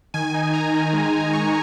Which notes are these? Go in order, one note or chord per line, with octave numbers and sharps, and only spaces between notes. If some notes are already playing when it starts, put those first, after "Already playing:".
D#3 G#5
D#4
D#3 A#5
D#3
G#3
D#3
D#4 C#6